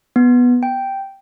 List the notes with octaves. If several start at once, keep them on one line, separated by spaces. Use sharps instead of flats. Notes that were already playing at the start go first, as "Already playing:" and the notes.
B3
G5